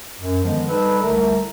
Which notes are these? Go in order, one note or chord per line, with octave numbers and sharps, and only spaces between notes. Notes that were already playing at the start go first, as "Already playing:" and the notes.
F#2
D3 D#3 F3 G#3 B3
G3 D#4 A4 B4
C2 D3 A3 A#4 E5